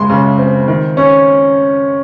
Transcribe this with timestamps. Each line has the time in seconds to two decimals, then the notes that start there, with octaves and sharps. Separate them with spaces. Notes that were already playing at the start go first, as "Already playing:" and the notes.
Already playing: C#2 G#3 C6
0.09 C#3
0.38 C4
0.68 D#3
0.97 C#4